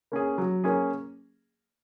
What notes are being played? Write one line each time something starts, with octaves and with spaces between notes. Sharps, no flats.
A#3 C#4 G#4
F#3
A#3 C#4 G#4